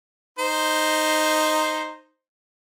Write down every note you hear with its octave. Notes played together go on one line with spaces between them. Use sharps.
D#4 C5